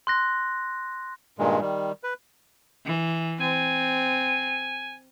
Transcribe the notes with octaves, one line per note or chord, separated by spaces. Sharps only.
C6 F#6 A#6
G2 A#2 D#3 G#3
D#3 G3
B4
E3
C4 G#5